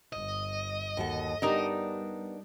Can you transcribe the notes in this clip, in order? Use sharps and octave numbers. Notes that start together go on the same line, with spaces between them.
G1 D#5
D#2 F#4 A4
G3 B3 D4 D#4 G4 A#4 D5